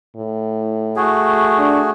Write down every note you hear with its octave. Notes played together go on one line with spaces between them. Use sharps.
A2
A3 F#4 G#4
D4